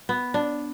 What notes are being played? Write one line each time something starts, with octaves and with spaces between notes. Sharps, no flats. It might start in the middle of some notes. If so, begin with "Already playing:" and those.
B3
D4